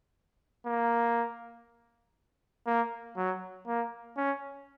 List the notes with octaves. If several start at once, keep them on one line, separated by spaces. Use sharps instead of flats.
A#3
A#3
F#3
A#3
C#4